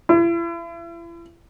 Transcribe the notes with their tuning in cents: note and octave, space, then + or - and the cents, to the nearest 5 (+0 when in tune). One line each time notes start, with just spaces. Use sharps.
E4 +40